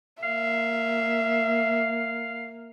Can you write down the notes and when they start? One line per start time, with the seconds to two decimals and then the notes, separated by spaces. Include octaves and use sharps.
0.23 A#3 E5 F5